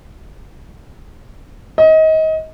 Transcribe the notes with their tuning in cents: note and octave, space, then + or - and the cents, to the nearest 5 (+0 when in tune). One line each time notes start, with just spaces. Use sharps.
D#5 +25